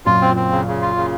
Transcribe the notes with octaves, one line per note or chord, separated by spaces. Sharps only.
F#2 A#2 F4
C4
C4
C#3
C#3
F4
C#3